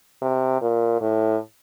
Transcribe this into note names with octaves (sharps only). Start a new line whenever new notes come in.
C3
A#2
A2